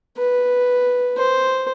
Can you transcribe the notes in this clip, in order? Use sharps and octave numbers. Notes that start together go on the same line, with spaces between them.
B4
C5